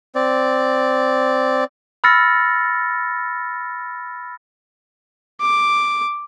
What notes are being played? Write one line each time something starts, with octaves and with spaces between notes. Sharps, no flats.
C4 D5
B5 E6 F6 A6 A#6 C#7
D6